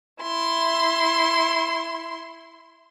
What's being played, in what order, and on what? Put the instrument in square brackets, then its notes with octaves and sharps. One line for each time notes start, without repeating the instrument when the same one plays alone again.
[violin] E4 C6